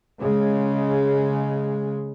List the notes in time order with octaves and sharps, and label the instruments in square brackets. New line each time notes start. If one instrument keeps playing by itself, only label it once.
[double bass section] C#3 G#3